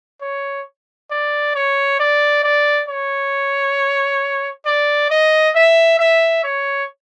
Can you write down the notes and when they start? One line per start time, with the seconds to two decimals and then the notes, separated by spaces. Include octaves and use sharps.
0.22 C#5
1.11 D5
1.55 C#5
2.00 D5
2.44 D5
2.89 C#5
4.66 D5
5.10 D#5
5.55 E5
5.99 E5
6.44 C#5